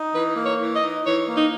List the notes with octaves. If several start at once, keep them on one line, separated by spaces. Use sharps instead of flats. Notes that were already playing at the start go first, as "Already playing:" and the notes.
Already playing: D#4
E3 B4
A#3
C#5
E3
D#5
D#4
E3 C#5
A#3
D#4